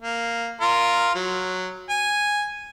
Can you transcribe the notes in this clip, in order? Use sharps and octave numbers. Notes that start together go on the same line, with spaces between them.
A#3
F4 A#4
F#3
G#5